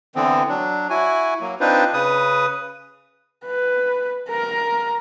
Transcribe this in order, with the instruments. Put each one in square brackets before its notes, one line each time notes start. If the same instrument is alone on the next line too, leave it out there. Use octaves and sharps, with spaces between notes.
[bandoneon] D3 E3 B3 C4
F#3 D4
E4 F#4 G#5
F#3 A#3
C4 D4 D#4 F4 B4 C5
C#3 B4 D#6
[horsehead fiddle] B4
A#4 A#5